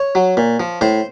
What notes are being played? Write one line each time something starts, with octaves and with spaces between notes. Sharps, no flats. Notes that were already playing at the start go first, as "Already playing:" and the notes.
Already playing: C#5
F#3
A#2
F3
A2 C5